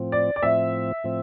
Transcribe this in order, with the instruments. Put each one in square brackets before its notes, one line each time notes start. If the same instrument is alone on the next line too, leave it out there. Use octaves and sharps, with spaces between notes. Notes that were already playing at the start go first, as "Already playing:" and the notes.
Already playing: [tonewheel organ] A2 F3 C4
[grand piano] D5
D5
[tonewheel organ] A2 F3 C4 [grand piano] E5
[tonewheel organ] A2 F3 C4